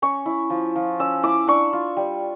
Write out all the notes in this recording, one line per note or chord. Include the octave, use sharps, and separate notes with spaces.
C#4 C#6
E4
F3
F3
C#4 E6
E4 D6
D4 C#6
F4
G3